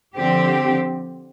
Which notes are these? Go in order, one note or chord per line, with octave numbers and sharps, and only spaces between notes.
D3 F3 C4 G4